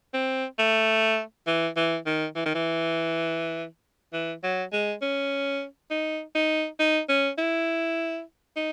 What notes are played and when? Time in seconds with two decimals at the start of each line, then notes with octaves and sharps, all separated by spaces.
0.14 C4
0.58 A3
1.47 E3
1.77 E3
2.06 D#3
2.36 E3
2.46 D#3
2.55 E3
4.13 E3
4.43 F#3
4.72 G#3
5.02 C#4
5.90 D#4
6.35 D#4
6.79 D#4
7.09 C#4
7.38 E4
8.56 D#4